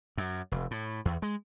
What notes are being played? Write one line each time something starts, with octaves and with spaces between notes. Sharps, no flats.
F#2
F1
A2
E2
G#3